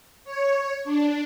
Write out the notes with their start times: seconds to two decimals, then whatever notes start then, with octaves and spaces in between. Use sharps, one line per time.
0.24 C#5
0.85 D4